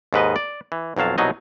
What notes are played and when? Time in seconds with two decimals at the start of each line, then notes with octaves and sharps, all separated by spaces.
0.13 D#2 G#2 B4 D#5
0.36 D5
0.72 E3
0.96 B1 F2 F#3 F5 A5
1.18 C2 B2 F#3 D#4 D#5